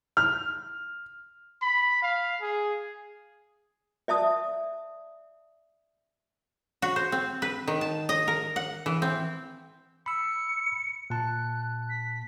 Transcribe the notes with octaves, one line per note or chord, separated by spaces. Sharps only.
F6
B5
F5
G#4
D5 E5 A5 D#6
F#4
C5
C4
B4
D#3
A5
D#5
A#4
F#5
E3
C4
B5 E6 C#7
A#2 A5 F#6
B6